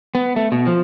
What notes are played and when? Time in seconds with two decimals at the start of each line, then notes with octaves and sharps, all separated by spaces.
0.15 B3
0.36 A3
0.52 B2
0.67 F3